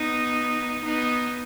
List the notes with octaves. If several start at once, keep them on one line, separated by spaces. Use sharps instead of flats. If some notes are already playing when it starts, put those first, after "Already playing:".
Already playing: B3 D#4
B3 D#4